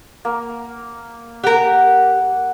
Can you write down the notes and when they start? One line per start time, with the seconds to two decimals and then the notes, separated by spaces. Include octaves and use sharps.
0.25 A#3
1.43 G4 A#4 F#5